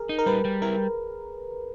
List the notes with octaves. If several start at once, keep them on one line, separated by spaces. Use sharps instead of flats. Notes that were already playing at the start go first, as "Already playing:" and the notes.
Already playing: G#4 A#4
D#4
A#4
G3 B4
G3
E4 A#4